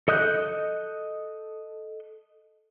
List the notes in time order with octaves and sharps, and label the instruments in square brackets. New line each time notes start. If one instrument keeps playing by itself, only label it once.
[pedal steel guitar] A4 D#5 D#6 F#6 G6